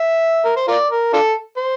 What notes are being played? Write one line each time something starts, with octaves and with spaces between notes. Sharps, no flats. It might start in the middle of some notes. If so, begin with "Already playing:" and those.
Already playing: E5
A#4
C5
F4 A#4 D5
A#4
D4 F4 A4
C5